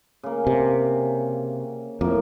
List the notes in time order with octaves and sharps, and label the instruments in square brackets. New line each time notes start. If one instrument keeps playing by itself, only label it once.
[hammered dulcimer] C#3 A#3
[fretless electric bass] C3
[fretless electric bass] F2 [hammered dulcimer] A2 A#3